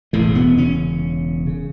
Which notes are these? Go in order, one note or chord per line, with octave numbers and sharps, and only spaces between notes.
E1 E2 A2 C#3 A3
B2 B3
C#3 C#4
C#3